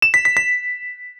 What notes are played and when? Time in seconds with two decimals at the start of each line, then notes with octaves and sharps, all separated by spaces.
0.02 E7
0.14 B6
0.25 B6
0.37 B6